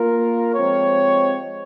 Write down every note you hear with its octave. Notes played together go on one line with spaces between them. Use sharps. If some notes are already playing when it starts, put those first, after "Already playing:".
Already playing: A#3 F4 A#4
F3 G#3 C4 G4 C#5